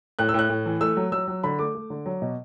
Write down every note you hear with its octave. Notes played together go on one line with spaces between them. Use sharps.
A2 F#6
E6
A2 F#6
A2
E3
A3 E6
F#3
F#3 E6
F#3
D3 B5
A3 D6
A3
D3
F#3
B2